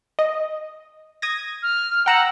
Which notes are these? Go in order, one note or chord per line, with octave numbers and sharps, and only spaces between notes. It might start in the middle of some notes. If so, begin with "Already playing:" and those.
D#5
D#6 G#6 A#6
F6
F#5 G5 A#5 E6